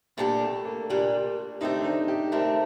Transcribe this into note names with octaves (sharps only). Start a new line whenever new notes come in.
A#2 G3 A3 D4 G4
A3
A#3
A#2 G3 D4 G4
D3 A3 C4 D#4 G4
D4
D#4
G4
D3 A3 C4 G4 A#4